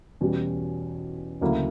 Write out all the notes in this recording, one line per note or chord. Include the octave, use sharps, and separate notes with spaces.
E2 B2 G3 C#4 F#4
D2 C#3 F#3 A#3 E4